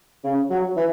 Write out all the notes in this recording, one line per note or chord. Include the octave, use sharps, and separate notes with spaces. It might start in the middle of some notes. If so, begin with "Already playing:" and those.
C#3
F#3
E3